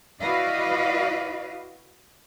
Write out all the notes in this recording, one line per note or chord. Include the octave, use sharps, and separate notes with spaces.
E4 F#4 B4 D5 D#5 F5